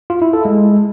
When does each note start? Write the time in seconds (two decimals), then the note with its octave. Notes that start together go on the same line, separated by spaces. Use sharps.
0.10 F4
0.22 E4
0.33 A4
0.45 G#3